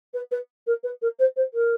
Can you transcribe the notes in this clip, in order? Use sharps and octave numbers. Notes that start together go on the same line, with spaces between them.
B4
B4
A#4
B4
A#4
C5
C5
A#4